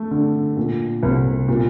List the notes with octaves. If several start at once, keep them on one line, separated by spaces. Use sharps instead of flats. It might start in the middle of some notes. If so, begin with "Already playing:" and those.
Already playing: A3
D3
A#2
C2
A#2